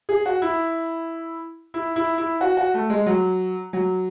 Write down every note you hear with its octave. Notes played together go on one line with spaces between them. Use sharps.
G#4
F#4
E4
E4
E4
E4
F#4
F#4
A3
G#3
F#3
F#3